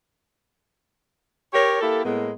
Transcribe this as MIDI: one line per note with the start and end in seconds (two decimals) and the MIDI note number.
1.53 1.78 67
1.53 1.78 70
1.53 1.78 73
1.81 2.04 58
1.81 2.04 64
1.81 2.04 67
1.81 2.04 69
2.05 2.32 45
2.05 2.32 56
2.05 2.32 58
2.05 2.32 59